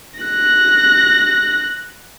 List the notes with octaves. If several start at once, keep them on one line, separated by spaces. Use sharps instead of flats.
F#6 A#6